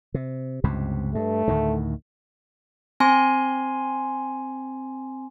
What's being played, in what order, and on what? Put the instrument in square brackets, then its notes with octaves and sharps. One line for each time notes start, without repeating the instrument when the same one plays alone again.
[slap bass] C3
C#2 G2 C3
[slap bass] G2 [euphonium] A3
[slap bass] D2 A2 D#3
[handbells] C4 G#5 C6